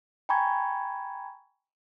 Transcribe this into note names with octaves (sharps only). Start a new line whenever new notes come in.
G5 G#5 A#5 B5 C#6 G#6